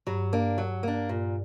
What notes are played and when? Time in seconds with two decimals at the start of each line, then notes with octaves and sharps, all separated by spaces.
0.07 G2 F#3
0.33 A#3 D4
0.58 F#3
0.83 A#3 D4
1.09 G2 A#2